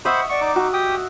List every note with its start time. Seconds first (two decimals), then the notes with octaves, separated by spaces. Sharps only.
0.05 C5 D#5 E5 F#5 B5 C#6
0.29 D5 F#5 C#6
0.41 D#4 D6
0.56 F#4 C#6
0.74 G4 G5 D#6